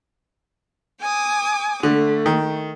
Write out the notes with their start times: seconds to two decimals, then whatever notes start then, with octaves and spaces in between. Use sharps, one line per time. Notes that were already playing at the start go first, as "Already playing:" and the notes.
1.01 G#5 D6 D#6
1.83 D3 A3
2.26 D#3